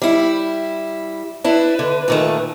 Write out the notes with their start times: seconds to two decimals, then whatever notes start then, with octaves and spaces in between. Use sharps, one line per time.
0.02 G3 E4
1.44 D4 E4 B4
1.79 D3
2.08 A#2 D#3 A3